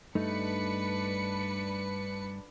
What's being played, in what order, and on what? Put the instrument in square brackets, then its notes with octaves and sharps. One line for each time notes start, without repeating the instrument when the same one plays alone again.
[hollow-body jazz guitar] G2 A3 D#4 [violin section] D4 B4 C#7